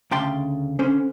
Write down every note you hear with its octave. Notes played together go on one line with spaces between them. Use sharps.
D2 C#3 G5 A5 C6
D3 C#4 C5